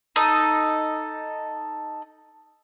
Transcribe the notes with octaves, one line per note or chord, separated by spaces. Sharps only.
D#4 A4